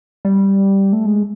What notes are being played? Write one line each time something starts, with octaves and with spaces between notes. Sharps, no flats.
G3
A3
G#3